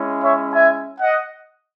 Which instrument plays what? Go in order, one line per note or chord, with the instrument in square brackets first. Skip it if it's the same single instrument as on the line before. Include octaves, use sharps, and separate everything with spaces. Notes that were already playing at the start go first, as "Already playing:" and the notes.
Already playing: [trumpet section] G#3 C#4 E4
C#5 E5
E5 G#5
D#5 F#5